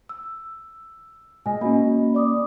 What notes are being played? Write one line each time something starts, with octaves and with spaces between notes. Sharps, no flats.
E6
A#2 G#3 D#5 G#5
A#3 C#4 F#4 D#5 B5
D5 D6 D#6